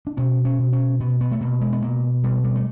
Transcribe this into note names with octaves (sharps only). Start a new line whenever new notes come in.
D4
B2 C#4
C#4
B2
C#4
B2 B3
B3
A3
B2 A#3
G#3
B3
B2 A#3
B2 G3
G3
A3